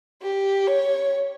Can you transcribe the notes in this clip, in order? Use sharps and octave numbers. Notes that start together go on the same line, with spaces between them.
G4
C#5